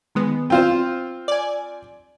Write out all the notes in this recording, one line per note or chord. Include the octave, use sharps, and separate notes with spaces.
D#3 G#3 B3
C4 F4 C5
D5 G#5